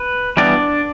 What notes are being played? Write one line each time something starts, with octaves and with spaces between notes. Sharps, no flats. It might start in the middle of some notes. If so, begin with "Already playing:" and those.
Already playing: B4
E3 G3 B3 D4 D5